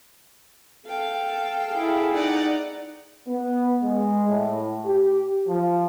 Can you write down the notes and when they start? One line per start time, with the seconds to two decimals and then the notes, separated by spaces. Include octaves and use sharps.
0.86 A4 F5 G5
1.70 E4 G#4
2.11 D#4 D5 F#5
3.27 B3
3.82 G#3
4.28 A2
4.86 G4
5.47 F3